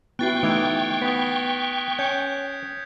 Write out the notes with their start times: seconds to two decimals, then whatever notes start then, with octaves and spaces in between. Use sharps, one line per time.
0.19 B3 E4 F#4 G5 C#6 F#6 A6 C7
0.43 E3 A3 D#4 D#6 G#6 D7
1.02 B3 D#6 B6
1.99 C#4 G6 G#6 C#7